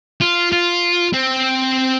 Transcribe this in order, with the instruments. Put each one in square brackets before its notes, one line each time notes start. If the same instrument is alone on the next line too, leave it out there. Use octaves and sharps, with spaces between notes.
[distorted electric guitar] F4
F4
C4